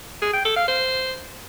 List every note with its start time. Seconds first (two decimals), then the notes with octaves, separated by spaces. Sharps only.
0.22 G#4
0.33 G5
0.45 A4
0.56 F5
0.68 C5